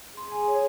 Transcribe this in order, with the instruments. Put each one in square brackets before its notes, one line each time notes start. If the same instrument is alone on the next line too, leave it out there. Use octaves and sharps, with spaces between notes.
[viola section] G#4 [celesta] C6
[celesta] G#5
C#5